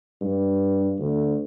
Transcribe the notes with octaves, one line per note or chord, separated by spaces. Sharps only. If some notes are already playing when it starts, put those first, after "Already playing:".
G2
D2